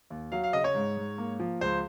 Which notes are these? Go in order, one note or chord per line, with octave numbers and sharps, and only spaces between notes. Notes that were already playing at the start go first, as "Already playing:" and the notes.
D#2
F#3 F5
F5
C#3 D#5
C#5
G#2
G#2
A#3
F3
C#2 C5